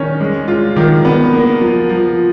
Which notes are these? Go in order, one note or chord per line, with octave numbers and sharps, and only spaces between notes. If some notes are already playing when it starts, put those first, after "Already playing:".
Already playing: D#3 C#4
G#3
F4
D#3
B3
A#3
F3
F3